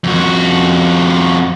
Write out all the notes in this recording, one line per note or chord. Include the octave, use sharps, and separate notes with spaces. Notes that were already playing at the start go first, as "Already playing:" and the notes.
F2 F#4